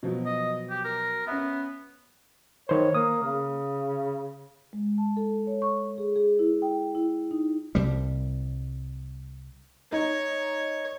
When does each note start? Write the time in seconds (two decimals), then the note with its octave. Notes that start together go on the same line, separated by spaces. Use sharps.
0.03 B2 F3 F#3
0.26 D#5
0.70 G4
0.85 A#4
1.27 B3 C#4 E5
2.69 D#3 C5 C#5
2.94 A#3 D#6
3.23 C#3
4.73 G#3
4.98 A5
5.17 A4
5.47 C#5
5.62 C#6
5.98 G#4
6.16 G#4
6.39 E4
6.62 G5
6.95 E4
7.31 D#4
7.75 C2 G3
9.92 D#4 C#5